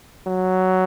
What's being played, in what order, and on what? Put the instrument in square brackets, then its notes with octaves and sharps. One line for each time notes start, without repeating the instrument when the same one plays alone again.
[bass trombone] F#3